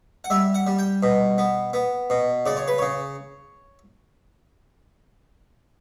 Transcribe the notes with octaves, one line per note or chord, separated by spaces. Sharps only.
F#5
G3 E5
F#5
G3
G5
B2
B3
B3
B2
C#3 D5
C#5
B4
C#3 C#5